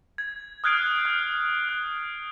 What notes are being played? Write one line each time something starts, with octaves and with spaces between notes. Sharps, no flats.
G#6
D#6 F6 F#6 G#6 C7 D7
F6 G6
F#6